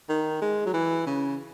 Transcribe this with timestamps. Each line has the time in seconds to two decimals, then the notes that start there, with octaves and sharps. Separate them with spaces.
0.09 D#3
0.41 G#3
0.66 F#3
0.74 E3
1.07 C#3